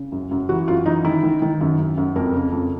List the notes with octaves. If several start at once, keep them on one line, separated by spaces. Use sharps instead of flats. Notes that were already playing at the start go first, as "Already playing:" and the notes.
Already playing: C#3
F#2
F#2
E3 F#4
F#2 F4
E3 D#4
D#3 E4
D#3
D#3
F#2
F#2
F#2
F2 A#4
C#3
F2